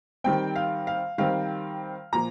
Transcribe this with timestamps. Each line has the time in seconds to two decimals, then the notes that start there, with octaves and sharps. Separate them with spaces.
0.24 D#3 G3 C4 G5
0.56 F5
0.87 F5
1.18 D#3 G3 C4 F5
2.12 A#2 F3 A#5